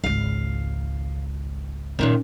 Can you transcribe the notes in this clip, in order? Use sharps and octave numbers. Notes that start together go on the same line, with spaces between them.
G#1 C#2 F5
F#2 A#2 D#3 C#4